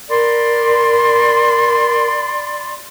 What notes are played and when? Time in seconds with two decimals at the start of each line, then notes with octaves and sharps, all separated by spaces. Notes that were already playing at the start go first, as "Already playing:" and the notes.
0.10 A#4 D5 B5 C6